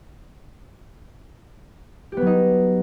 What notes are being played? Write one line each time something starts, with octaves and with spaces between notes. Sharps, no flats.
F#3 B3 D#4 G4